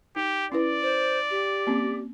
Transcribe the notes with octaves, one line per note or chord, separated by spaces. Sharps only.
D#4 G4
C#4 E4 B4 D5
C5
G4
A#3 C4 C#4